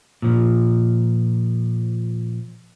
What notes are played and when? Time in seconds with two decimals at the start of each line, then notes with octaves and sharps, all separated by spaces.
0.22 A#2 F3